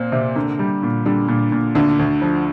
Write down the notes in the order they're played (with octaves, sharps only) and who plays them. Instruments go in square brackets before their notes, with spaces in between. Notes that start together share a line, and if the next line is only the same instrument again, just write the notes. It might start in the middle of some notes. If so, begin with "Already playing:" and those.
Already playing: [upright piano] A#2 [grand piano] C4
[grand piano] C3
[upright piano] D3 [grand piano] A#3
[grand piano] G3
A#2
[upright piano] D3 [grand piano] G3
[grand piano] A#2
A#2
[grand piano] D2 [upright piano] D3
[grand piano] D2
F3